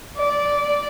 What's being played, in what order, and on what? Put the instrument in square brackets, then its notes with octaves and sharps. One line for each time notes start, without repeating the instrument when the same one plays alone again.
[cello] D5